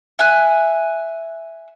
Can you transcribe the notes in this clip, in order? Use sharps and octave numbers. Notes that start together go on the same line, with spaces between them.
E5 G#5 F#6